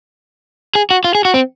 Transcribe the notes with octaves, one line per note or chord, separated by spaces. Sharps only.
G#4
F#4
F4
G#4
F#4
C4